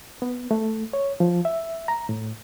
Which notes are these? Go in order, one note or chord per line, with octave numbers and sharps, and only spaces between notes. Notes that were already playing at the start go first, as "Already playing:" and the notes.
B3
A3
C#5
F3
E5
A#5
A2